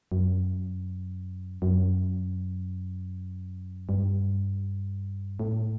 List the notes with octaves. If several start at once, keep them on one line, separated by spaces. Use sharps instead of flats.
F#2
F#2
G2
A2